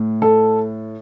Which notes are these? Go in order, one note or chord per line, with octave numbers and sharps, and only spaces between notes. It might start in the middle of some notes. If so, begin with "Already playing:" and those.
Already playing: A2
A4